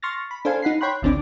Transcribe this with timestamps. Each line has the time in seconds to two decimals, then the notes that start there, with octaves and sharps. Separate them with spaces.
0.03 C6 C#6 F6 A6 A#6
0.31 B5
0.45 D4 A4 C5 F5 G#5
0.62 D#4 F#5 B5 C7
0.81 C#5 G5 B5 C6 F#6
1.02 G#1 C#2 D3 C4 D4 D6